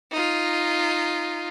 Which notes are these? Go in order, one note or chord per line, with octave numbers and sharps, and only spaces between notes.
D#4 F4